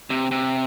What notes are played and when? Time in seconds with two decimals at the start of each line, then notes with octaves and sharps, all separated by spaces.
0.10 C3
0.31 C3